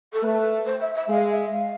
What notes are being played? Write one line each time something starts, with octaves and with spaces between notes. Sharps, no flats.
A4
A3 B4
C5
E5
E5
G#3 F5
E5
F5